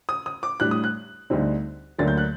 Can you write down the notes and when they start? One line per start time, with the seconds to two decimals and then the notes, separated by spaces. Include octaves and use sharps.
0.09 D#6
0.26 D#6
0.43 D6
0.60 A2 G3 D4 F#6
0.71 D#6
0.84 F#6
1.30 D2 D3 G3 C4 D#4
1.98 D2 D3 F#3 A#3 A6
2.08 G6
2.17 F#6